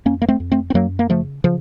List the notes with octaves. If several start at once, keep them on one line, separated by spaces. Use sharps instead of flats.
F2 A#3 C#4
A#3
A3 C4
F2
A3 C4
C4
F#2 F#3 A#3
A#3
C#3 F3 A3
C#3 F3